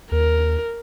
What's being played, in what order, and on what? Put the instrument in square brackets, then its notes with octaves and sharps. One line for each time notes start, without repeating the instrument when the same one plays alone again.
[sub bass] D#2 [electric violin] A#4